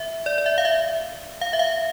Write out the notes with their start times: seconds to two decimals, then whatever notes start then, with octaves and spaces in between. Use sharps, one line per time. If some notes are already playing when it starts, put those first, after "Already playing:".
Already playing: E5
0.26 D5
0.38 D5
0.46 E5
0.58 F5
0.65 E5
1.41 F5
1.53 E5
1.59 F5